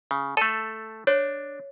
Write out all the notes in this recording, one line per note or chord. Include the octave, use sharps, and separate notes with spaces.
C#3
A3 A4 A5
D4 C#5